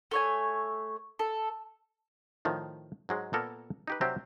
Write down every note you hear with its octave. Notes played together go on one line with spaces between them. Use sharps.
A3 C#5 G#5
A4
A2 D#3 F3
G#2 F#3 G#3
A#2 A#3 B3 A4 A#4
D#4 G4 B4
C3 F#3 C4 D4 G4